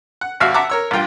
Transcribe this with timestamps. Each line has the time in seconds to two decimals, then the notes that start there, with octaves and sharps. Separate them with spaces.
0.21 F#5
0.40 G#1 D#2 F#4 E5 F5 F6
0.54 E5 F#5 A5 A#5 D6 E6
0.70 A#4 C#5 E6
0.91 A1 G2 F4 G5